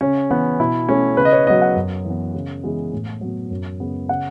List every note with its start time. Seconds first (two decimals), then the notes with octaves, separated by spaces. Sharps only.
0.01 C#3 C#4
0.30 E3 B3
0.59 B2 E4
0.89 A3 C#4
1.17 C#3 B4
1.25 D#5
1.33 C#5
1.47 F#3 B3 D#5
1.62 F#5
1.76 F#2
2.05 E3
2.10 B3
2.34 C#3
2.63 E3 G#3 B3
2.93 A2
3.21 F#3 B3
3.50 F#2
3.80 C#3 G#3 B3
4.09 C#3 F#5